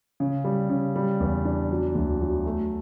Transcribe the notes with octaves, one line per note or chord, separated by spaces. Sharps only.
C#3
G3
C#3
G3
E2
D4
F#3
D2
F#3
A3